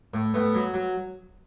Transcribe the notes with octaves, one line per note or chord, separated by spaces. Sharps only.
A2
A2 B3
F#3
F#3